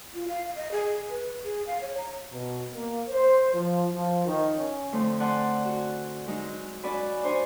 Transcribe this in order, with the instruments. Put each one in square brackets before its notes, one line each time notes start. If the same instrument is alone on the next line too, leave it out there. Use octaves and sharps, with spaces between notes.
[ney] F4
F5
D#5
G#4
B4
G#4
F5
C#5
A#5
[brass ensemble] B2
A#3
C5
F3
F3
D#3
C#4
[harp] D3 F3 A3 C4
D5 F#5 G#5 A5 C6
F#4
F#3 G#3 D#4
C#4 F#4 D5 G#5 B5
D4 C5 C#5 G#5